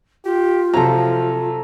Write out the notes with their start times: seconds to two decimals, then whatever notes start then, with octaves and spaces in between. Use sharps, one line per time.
0.25 F4 G4
0.73 C3 F3 F#3 A4 A#5